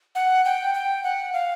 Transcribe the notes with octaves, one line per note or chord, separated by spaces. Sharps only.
F#5
G5
G5
F#5
F5